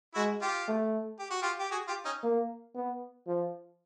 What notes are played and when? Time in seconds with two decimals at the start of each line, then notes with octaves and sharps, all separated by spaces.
0.15 G#3 E4 F#4
0.42 F4 G4
0.68 A3
1.19 G4
1.30 F#4
1.42 F4 G4
1.59 G4
1.71 F#4 G#4
1.88 F4 G4
2.05 C#4 D#4
2.23 A#3
2.75 B3
3.27 F3